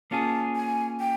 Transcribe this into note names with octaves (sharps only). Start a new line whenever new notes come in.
A#3 C#4 F4 G#4 A5
G#5
G5